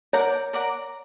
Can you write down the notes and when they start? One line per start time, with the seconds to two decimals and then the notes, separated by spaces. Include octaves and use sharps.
0.13 A#4 C#5 D5 F#5 A#5
0.53 A#4 D5 F#5 A#5